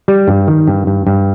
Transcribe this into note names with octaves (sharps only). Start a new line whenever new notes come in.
G3
G2
D#3
G2
G2
G2